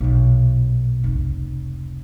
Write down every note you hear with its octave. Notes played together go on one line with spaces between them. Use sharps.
B1 A#2
F1 C#2